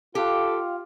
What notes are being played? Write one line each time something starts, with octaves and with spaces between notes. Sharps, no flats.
F4 G4 A4 F5 G5